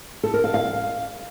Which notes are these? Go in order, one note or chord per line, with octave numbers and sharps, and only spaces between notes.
A4
A#4
F5
F5